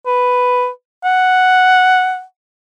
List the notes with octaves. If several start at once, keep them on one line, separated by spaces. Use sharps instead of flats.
B4
F#5